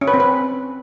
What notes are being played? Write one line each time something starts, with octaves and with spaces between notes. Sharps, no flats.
C#4
B4
C4
B4